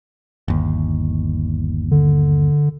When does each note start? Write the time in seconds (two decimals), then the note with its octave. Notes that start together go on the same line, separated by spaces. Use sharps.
0.48 G1 D#2
1.91 D3